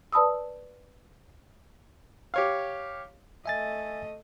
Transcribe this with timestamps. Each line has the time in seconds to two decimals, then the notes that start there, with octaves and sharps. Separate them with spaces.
0.13 B4 D5 A5 B5 D#6 E6
2.34 G4 C#5 F5
3.46 A3 D#5 E5 G#5 A6